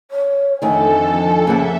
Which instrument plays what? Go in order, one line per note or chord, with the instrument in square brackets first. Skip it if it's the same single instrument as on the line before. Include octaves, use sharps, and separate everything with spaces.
[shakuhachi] C#5
[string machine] F2 A4 [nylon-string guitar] D3 D#3 A3 [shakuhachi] G#5
[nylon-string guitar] C#3 A#3 F#5 [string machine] E5